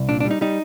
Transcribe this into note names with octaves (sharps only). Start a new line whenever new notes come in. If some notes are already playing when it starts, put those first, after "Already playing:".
Already playing: C2
A#2 D4
D4
G3
D#4
G3 D#4